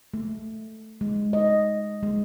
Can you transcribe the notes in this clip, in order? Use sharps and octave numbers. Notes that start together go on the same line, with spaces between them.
A3
G#3
D#5
G#3